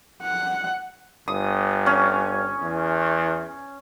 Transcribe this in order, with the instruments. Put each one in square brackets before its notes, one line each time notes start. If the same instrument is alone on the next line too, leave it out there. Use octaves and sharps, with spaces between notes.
[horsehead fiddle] F#5
[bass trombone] G1 [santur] D#6
[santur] C#4
[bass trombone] E2